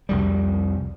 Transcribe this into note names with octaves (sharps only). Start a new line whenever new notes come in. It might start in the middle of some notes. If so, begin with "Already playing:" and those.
C2 F2 G3